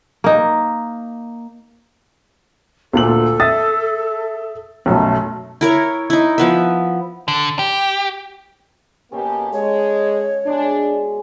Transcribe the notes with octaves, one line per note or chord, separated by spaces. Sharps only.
A#3 D#4
D2 A#2 A4 F#7
E5 D#6 A6
B1 F#2 B2 A3
E4 A#4 C#5
D#4 E4
F3 B3 E5
D3
G4
B2 A#3 C#4 G4 A4 C#6
G#3 C#5
B2 G#3 D4